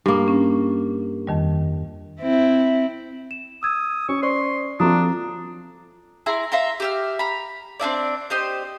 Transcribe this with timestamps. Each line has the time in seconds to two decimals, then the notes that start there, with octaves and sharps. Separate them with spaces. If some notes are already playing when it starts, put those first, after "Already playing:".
0.06 G2 A#3
0.28 C#4
1.27 F2 D#3 G3
2.21 C4 E4
3.31 E7
3.63 D#6 E6 G#6
4.09 C#4 C#6
4.23 C5 D5 C6 C#6
4.80 F3 C4 D4 F4 A4 A#5 D#6
6.26 E4 G#4 A#5 C6
6.52 E5 F5 A#5 C6
6.80 G4 E5 F6
7.19 A#5 B5
7.80 C4 D4 E4 D5
8.30 G4 C5 D#5